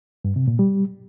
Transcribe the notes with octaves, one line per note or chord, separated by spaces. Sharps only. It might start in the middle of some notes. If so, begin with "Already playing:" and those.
G2
C3
A#2
G3